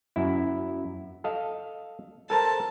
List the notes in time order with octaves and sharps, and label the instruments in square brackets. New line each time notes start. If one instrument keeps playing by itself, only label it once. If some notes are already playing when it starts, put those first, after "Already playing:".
[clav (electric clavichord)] F#2 E4
A4 D#5 F5
[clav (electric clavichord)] A4 A#4 C5 [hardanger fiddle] A5